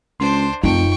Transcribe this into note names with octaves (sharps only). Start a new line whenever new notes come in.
C#2 D4 C5 C6
F1 F#2 D#4 F4 G5 C#6